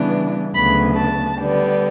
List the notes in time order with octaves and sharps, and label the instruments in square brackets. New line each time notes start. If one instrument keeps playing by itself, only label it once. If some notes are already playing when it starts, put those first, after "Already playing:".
Already playing: [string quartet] C#3 E3 G3 B3 D4
D2 C#3 F#3 B3 B5
A5
D3 G3 B3 D4